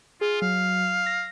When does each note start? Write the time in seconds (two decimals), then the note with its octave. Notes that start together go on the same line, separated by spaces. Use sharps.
0.21 F4 G#4
0.42 F#3 F5
1.06 A#6